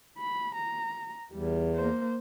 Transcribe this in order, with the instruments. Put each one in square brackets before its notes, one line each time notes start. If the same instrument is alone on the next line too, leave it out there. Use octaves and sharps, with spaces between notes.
[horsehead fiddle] B5
A#5
[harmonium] E2 [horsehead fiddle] G3
[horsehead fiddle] A#3 C5